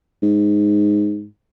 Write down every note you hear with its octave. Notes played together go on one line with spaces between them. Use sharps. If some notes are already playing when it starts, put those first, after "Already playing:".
G#2